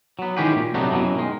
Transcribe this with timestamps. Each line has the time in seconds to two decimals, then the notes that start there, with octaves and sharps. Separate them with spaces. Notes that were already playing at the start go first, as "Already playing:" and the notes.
0.19 F#3 B3
0.37 D#3 E3 G#3 C#4 G4 B4
0.56 A#2
0.74 C3 F#3 A3 B3 D4 D#4
0.91 F#2 B2 D#3 E3 F#3
1.16 D#3 G#3